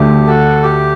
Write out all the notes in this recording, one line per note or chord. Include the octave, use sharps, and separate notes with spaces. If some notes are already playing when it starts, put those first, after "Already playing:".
Already playing: D2 D3 A3 G4
F#4 A4
G4